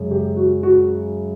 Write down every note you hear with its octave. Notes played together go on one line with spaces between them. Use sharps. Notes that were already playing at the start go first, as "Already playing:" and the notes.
Already playing: F#2 C#3 G#3
G4
F#4
F#4